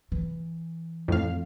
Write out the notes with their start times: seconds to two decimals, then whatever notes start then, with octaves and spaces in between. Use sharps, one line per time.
0.12 E3
1.08 F2 A2 F5